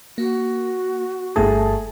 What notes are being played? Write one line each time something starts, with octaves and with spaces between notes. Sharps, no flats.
A#3 F#4
G1 G2 A3 G#4 A5